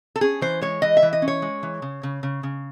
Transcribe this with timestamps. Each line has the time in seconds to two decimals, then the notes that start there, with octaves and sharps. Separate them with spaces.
0.16 A4
0.21 C#4 G#4
0.41 E3 C5
0.61 G#3 C#5
0.82 E3 D#5
0.97 E5
1.02 E3
1.13 D#5
1.22 C#4
1.28 C#5
1.42 G#3
1.63 E3
1.82 C#3
2.03 C#3
2.23 C#3
2.43 C#3